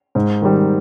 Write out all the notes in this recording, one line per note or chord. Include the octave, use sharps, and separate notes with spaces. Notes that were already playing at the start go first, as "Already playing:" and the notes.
G#2
D#3 G3